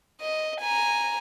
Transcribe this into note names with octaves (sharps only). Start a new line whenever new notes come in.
D#5
G#5 A#5